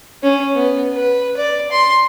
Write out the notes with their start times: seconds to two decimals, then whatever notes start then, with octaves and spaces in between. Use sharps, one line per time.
0.23 C#4
0.55 B3
0.93 B4
1.37 D5
1.72 C6